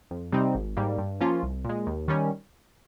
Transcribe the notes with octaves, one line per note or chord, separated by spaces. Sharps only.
F2
C3 G3 C4 D#4
G#1
G#2 G3 A#3
G2
F3 A#3 C#4 F4
C2
A#2 G#3
D#2
D#3 G3 C#4